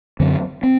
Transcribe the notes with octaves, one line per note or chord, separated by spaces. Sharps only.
F#2 D3 F#3 C4
C4